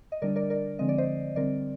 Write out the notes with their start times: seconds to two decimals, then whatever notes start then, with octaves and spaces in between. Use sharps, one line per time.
0.12 D#5
0.22 D3 G3 D4 A#4 D5
0.36 A#4 D5
0.50 A#4 D5
0.79 D3 F3 G#3 C4 D#5
0.89 D5
0.98 C5 D#5
1.36 D3 G3 C4 A#4 D5